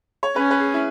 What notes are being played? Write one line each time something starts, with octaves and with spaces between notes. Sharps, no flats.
C#5
C#4 B4
B4
G#4
E4